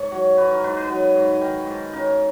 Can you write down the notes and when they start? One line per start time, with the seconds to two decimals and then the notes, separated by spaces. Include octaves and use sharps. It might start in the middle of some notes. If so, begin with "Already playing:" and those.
Already playing: G#2 C#5
0.12 F#3
0.37 G#2 B4
0.51 A#4
0.63 G#2 B4
0.77 B4
0.89 F#3
1.16 G#2
1.41 D#3
1.67 G#2
1.93 C#3 A#4